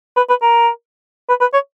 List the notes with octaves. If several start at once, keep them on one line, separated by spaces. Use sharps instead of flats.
B4
B4
A#4
B4
B4
C#5